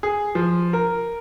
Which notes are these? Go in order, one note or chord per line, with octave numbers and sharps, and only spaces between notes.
G#4
F3
A#4